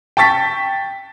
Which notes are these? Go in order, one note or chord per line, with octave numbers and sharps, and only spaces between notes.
G5 A5 C#6 A6 B6